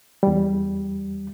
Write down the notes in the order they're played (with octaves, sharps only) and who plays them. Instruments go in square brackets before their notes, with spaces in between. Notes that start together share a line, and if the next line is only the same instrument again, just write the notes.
[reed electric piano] E2 G3